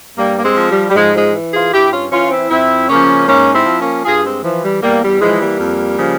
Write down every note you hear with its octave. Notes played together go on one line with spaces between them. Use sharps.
G2 G3 A#3
A#3
G#3 C4
F3
G3
G3
G#2 F3 G#3
F3 G#3
E3
F4 G#4
G2 E4 G4
C#4 F4
E3 C#4 F4
C4 E4
F2 C4 E4
C#3 F3 A#3 C#4
G#2 A#3 C#4
C4 E4
F3
A#3 C#4
G2 F4 G#4
G#3 C4
E3 F3
G3
E2 G3 A#3
G3
E3 F3 G#3
G3 A#3
F2
C#3 F3